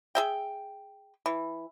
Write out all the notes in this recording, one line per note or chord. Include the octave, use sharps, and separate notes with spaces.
G#4 E5 G5
E3